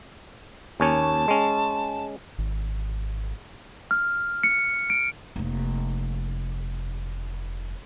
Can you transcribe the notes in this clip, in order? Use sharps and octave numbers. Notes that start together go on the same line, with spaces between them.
D#2 C#4 C#5 A5
G#3 C#4
G#1
F6
C#7
D7
F1 A#3